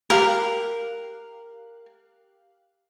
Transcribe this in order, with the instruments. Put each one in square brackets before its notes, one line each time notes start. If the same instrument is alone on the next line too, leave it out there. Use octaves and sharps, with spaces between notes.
[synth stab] G4 F5 F#6 [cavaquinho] A#4